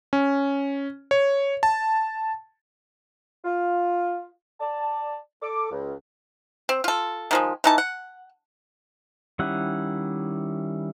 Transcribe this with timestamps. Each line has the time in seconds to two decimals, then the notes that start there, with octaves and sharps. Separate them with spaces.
0.13 C#4
1.11 C#5
1.63 A5
3.44 F4
4.60 D5 A5
5.41 A4 D6
5.71 C#2
6.69 C4
6.84 F4 A4
7.31 D#3 F3 G#3
7.64 E3 D#4 A5
7.78 F#5
9.39 D#3 G3 C#4 E4 F#5